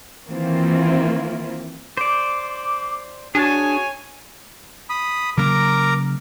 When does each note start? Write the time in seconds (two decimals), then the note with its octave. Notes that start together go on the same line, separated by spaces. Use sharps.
0.27 D#3 E3 A#3 C4 E4 F4
1.97 C5 D5 D6
3.35 D4 F#4 G#4 C#5 G#5 A5
4.90 B5 D#6
5.37 C#3 F#3 A#3 A#4 A#5 D6